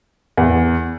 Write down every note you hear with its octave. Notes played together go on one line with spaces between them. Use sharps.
E2